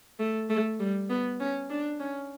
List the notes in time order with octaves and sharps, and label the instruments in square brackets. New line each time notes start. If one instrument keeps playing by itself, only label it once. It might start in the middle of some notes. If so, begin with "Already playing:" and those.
[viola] A3
A3
G3
B3
C#4
D4
C#4